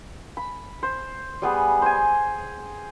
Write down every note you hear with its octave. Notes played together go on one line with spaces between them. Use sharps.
B5
C5
G3 B3 G#4
C5 G#5